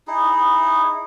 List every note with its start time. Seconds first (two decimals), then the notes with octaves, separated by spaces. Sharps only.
0.07 D#4 E4 G#4